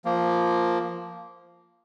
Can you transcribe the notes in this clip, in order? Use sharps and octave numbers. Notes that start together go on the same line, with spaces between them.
F3 A#3